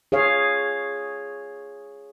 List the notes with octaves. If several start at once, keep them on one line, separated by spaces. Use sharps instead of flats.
G#4 C#5 F5